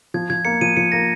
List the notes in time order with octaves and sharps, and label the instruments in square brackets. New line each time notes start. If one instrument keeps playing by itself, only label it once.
[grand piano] F3 [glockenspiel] G#6
[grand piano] F3 [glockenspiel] G#6
[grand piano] A#3 [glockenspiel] C#7
[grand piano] F3 [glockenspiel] D#7
[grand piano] F3 [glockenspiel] C#7
[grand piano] A#3 [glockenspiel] A#6